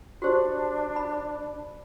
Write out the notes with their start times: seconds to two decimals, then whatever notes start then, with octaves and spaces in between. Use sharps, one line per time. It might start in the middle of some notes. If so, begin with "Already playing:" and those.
0.22 D4 F#4 G4 C5
0.96 B5